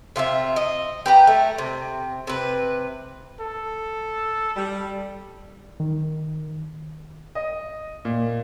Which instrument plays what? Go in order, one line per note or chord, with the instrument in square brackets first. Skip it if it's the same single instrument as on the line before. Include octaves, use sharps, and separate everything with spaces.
[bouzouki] C3 F4 G#4 E5
D#5
G4 B4 A#5
A3
C3
C3 B4
[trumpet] A4
[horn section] G3
[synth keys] D#3
[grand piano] D#5
A#2